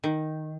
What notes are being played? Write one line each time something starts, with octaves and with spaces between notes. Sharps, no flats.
D#3